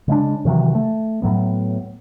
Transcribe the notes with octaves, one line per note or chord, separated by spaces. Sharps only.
C#3 G#3 D4
C3 D#3 E3 F#3
A3
A2 F#3 B3